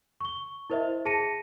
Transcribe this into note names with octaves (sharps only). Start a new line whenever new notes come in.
C#6 G7
E4 A#4 C5 D#5 E5
G#4 A5 A#6 C#7 D#7